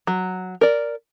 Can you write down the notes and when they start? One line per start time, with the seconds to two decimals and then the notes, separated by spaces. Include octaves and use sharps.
0.07 F#3
0.61 A#4 D5